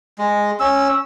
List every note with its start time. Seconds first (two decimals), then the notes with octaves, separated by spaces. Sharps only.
0.18 G#3
0.60 C#4 E6